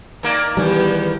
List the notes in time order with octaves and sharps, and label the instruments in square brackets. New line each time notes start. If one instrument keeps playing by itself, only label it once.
[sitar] D#3 A#3 [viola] D5 A#5
[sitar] E2 [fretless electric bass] D#3 G3 [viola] B3 G4